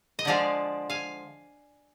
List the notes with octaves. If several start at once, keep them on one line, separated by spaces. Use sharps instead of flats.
D#5
D3 F3 G#3 D5 F5
F5 G#5